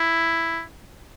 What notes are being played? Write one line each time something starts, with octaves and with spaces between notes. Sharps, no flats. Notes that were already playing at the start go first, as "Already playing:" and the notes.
Already playing: E4